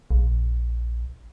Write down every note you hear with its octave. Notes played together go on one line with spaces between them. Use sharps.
A#1